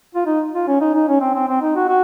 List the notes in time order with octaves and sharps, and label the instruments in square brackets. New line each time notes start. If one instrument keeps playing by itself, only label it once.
[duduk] F4
D#4
F4
C#4
D#4
D#4
C#4
C4
C4
C4
D#4
F#4
F#4